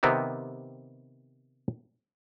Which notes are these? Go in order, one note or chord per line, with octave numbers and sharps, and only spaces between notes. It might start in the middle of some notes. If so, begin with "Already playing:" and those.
C3 D#3 B3 C4 G4